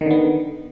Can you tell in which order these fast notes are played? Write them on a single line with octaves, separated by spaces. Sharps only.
D#3 D3 B3